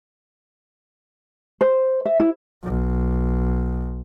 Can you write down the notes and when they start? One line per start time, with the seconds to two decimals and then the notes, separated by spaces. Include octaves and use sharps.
1.61 C5
2.05 E5
2.20 E4
2.64 B1